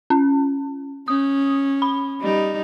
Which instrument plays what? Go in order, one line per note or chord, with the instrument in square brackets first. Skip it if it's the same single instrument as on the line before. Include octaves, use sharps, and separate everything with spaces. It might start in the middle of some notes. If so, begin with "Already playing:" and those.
[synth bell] C#4
[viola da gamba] C#4 [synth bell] D#6
[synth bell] B5
[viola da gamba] G3 D#4